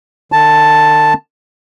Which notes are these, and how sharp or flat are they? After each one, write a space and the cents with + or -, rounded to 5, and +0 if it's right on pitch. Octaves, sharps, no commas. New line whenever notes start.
D3 +45 A5 +0